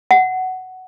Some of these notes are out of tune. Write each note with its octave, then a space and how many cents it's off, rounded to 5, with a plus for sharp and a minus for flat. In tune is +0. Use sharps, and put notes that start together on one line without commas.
F#5 +10